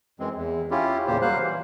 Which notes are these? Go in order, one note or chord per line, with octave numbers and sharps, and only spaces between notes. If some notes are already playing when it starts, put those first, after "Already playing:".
F#2 E3 G#3 C4
E2
C#4 E4 F4 G4
E2 A#2 C#3 A#3 G4 C5
F#3 G3 A#3 C5 F5 F#6
E3